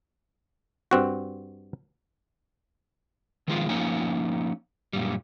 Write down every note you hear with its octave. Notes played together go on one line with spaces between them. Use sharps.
G2 C4 F#4
D#3 F3 G#3 C4 F4
F3 A#3 C#4 D#4 G#5
F#2 A#2 G3